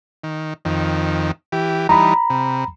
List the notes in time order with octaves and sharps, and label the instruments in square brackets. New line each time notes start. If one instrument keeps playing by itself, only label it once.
[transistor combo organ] D#3
F2 D#3
E3 G4
[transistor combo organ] E3 G3 D#4 [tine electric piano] A#5 B5
[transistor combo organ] C3